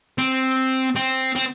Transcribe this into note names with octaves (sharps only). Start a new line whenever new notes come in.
C4
C4
C4